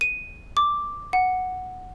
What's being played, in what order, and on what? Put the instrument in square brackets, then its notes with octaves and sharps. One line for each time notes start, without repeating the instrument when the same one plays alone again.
[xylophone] D#7
D6
F#5